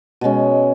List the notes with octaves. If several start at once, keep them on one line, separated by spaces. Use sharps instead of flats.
B2 G#3 C#4